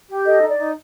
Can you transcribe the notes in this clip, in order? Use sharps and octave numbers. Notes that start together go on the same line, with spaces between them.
G4
A4 D#5
D#4
D5
D#4